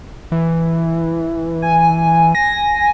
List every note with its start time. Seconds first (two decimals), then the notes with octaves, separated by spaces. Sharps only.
0.32 E3
1.62 G#5
2.35 A#6